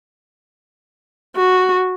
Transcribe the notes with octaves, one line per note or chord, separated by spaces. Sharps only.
F#4